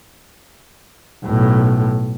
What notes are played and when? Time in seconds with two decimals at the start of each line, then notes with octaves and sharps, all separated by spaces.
1.25 B1 A2